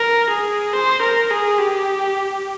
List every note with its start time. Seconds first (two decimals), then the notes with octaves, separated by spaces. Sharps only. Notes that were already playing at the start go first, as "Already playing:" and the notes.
Already playing: A#4
0.30 G#4
0.73 C5
1.02 A#4
1.30 G#4
1.58 G4